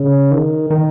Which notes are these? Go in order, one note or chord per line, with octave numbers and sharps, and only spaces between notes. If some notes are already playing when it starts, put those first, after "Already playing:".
Already playing: C#3
D#3
D#3